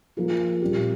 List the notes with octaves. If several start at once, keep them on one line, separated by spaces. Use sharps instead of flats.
F3 A#3 F4 G#4
A#2 G3 C4 G4